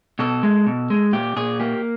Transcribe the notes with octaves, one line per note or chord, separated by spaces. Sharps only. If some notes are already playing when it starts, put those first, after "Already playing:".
B2 A4
G#3
B2
G#3
A#2 G4
A#2 G#4
A#3 G4